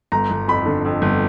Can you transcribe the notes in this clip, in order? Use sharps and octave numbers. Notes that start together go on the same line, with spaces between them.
G1 A#5
G1
F2 B5
D3
F2
G1